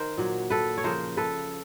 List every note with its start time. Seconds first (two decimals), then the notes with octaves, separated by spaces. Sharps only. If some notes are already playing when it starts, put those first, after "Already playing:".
Already playing: D#3 A#4 C5
0.18 A#2 F#3
0.50 A4 B4
0.78 C#5
0.84 C#3 F3 A#4 C5
1.17 A4 B4